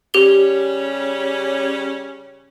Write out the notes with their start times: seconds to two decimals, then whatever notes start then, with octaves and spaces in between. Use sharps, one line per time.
0.14 C#3 G3 C#4 G4 G7